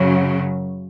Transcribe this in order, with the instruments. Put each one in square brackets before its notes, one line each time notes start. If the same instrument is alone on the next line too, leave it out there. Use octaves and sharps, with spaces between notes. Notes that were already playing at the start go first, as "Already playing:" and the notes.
Already playing: [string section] F#2 C#3 F#3